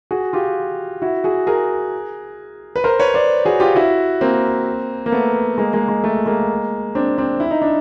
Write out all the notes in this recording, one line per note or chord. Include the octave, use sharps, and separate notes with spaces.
F#4 G#4
F4 G4
E4 F#4
F#4 G#4
G#4 A#4
B4
A#4 C5
B4 C#5
C5 D5
F#4 G#4
F4 G4
E4 F#4
A#3 C4
A#3
A3 B3
G#3 A#3
G#3 A#3
G#3
A3
G#3 A#3
C4 D4
C4 D4
E4
D#4
D4